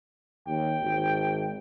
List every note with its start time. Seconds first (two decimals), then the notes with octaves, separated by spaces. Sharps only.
0.47 D#2 G5
0.82 G#1